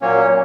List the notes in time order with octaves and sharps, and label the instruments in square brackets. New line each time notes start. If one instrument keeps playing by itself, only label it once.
[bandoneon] A#2 F#3 A#3 C#4 C#5